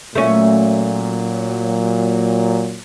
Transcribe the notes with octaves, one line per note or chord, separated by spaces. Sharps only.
A#2 F#3 A3 C#4